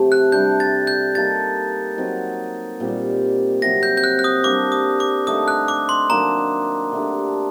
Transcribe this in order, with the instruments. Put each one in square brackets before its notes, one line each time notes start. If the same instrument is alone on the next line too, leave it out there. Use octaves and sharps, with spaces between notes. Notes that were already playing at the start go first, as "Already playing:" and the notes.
Already playing: [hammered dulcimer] C3 F#3 A3
[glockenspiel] F#6
[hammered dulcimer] C3 G3 D4 [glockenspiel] G6
[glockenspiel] A6
G6
[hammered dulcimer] G3 A#3 D#4 A4 [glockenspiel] A6
[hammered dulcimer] F#3 C4 D#4 F#4
A#2 G3 C4 G4
[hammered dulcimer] C3 F#3 C4 [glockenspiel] A#6
[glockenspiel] G6
G6
F#6
F#6
D#6
[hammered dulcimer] G3 A#3 D4 G4 [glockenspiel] D6
[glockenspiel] D#6
D6
[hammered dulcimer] D3 A3 D#4 A4 [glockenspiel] D#6
[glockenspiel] F#6
D6
C6
[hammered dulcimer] D#3 F#3 A#3 D4 [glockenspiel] A#5
[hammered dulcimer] D3 A3 D4 G4